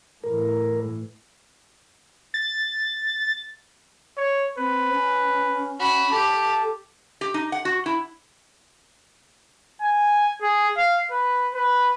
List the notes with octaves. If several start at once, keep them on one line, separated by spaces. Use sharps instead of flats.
A2 E3 A#4
A6
C#5
C4 B4
C#4
F#4 B5
G4 A4 A5
G4
D#4
F#5
F#4
E4
G#5
G#4
F5
B4
B4